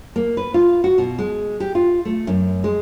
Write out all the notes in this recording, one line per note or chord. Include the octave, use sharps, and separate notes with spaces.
A#3
B4
F4
F#4
B2
G#3
G4
F4
A3
F#2
G#3